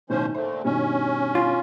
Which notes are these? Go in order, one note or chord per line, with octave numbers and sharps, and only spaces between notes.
B1 A2 D#3 F3 C#4 C5
A#2 D3 A3 C5
G2 B2 D#3 C#4
F4